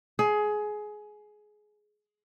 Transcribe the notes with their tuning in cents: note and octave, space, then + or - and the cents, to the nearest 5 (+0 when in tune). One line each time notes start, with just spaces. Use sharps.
G#4 +20